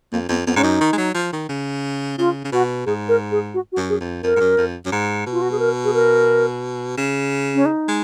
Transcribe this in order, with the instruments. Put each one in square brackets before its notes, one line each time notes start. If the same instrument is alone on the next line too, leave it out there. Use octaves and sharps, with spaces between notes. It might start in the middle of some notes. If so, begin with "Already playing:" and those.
[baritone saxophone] F2 [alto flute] A#3
[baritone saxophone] F2 [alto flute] B3
[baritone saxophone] F2 [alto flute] B3
[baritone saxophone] G#2 [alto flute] C#4
[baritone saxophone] F#2 [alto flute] D#4
[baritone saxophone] D#3
G#3
F#3
F3
D#3
C#3
[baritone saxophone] C#3 [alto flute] F4
[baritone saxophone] C#3
[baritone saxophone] B2 [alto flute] F#4
[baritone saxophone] G#2 [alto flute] G#4
[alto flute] A#4
G#4
F#4
F#4
[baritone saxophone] F#2
[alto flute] G#4
[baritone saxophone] F2
[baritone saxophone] F2 [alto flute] A#4
[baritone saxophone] G#2
F#2
F2
F#2
G#2
B2
[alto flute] F4
F#4
G#4
A#4
G#4
A#4
[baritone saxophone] C#3
[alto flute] C#4
D#4
[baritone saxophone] G#3